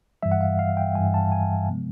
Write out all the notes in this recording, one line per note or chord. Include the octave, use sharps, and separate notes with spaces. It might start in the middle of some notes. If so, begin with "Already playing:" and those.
G2 E3 G3 E5
F#5
F5
F5
G5
G2 E3 G3 G#5
A5
G#5
C3 F3 G#3 B3